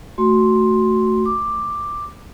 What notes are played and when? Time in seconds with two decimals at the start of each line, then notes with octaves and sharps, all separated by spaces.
0.18 A3 F#4 C6
1.26 D6